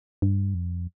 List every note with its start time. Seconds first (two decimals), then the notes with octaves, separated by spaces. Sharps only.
0.22 G2
0.54 F2